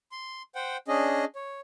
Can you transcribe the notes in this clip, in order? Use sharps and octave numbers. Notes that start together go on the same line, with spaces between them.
C6
C5 F#5 G5
C#4 D4 G#4 D#5
C#5